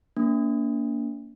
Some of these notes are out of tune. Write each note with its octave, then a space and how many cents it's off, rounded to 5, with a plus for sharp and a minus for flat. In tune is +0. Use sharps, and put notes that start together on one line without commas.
A#3 +0 D4 -40